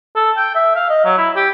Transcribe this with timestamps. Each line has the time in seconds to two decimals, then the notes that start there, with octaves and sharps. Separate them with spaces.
0.16 A4
0.37 G5
0.55 E5
0.75 F5
0.90 D#5
1.05 F#3
1.18 E4
1.36 G4